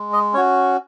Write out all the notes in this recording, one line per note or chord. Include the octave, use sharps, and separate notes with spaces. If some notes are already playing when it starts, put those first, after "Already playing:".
Already playing: G#3
D#5
C#4 F#4 C#5